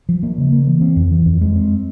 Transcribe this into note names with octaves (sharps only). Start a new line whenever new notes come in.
F3
A#3
C#3
A#3
E3
C4
F2
E3
F2
G#3
C4